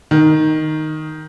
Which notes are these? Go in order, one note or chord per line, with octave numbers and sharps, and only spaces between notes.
D#3